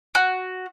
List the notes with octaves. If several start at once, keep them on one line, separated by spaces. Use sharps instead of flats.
F#4